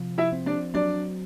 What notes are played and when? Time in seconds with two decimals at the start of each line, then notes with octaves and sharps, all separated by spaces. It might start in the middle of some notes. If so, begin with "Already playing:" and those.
Already playing: C3 F3
0.18 E4 E5
0.32 C4
0.46 D4 D5
0.74 F#3 D4 D5